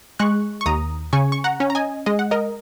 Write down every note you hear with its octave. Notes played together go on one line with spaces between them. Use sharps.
G#3 C#6 F#6
C#6
D#2 A#5 D#6
C#3 G#5 C#6
C#6
F#5 A#5
C#4
A#5
D#5 G#5
G#3 D#5
F#5
A#4 D#5